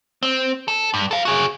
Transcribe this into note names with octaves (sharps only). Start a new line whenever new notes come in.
C4
A4
G2
A4 F5
F#4 G#4